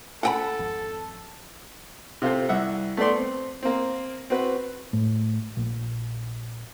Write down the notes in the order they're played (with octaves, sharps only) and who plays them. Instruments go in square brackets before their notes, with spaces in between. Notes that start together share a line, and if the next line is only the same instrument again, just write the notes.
[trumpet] A4 [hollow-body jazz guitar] F#5 G5 B5
[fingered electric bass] G#1 F2
[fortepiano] C3 C4 F4 A4 C5
C2 E5 F#5
A3 B3 A4 D5 C6
C4
A#3 C4
C4 F#4 B4
[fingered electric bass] A2
A#1